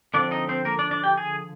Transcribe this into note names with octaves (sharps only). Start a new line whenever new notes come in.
D3 F3 C4 D4 D5
D#4 D#5
C4 C5
A#3 A#4
D4 D5
D4 D5
G4 G5
G#4 G#5